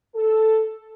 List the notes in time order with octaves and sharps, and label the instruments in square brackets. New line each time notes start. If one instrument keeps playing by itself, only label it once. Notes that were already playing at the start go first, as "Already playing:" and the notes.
[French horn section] A4